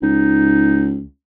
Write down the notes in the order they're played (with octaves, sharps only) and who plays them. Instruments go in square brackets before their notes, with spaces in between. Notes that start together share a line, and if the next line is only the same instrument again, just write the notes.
[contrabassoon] C#2 [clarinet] D#4